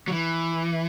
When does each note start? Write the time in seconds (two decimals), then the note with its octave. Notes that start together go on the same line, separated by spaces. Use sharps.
0.08 F#3
0.12 E3